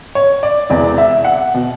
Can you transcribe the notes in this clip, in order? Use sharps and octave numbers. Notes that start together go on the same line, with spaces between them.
C#5
D5
E1 E2 C3 D5
E5
F#5
B2